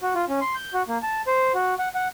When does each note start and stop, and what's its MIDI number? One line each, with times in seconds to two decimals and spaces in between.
0.02 0.14 66
0.15 0.25 65
0.29 0.40 61
0.41 0.55 84
0.55 0.73 91
0.74 0.83 66
0.88 0.98 58
1.03 1.21 81
1.27 1.52 72
1.54 1.75 66
1.79 1.88 78
1.95 2.08 78